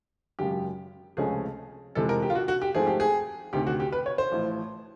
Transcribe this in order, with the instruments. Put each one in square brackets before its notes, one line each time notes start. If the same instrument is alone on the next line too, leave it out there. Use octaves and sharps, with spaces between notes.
[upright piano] G#1 F#2 C#3 F#3 G4
C#2 C3 F3 A3 C#4 G#4
F2 C3 E3 G#3 A4
A#4
G4
F4
F#4
F#4
G4
G#2 F3 A3 C4 G#4
G4
G#4
D2 C3 D#3 G4
F#4
G4
B4
C#5
C5
A1 A2 F3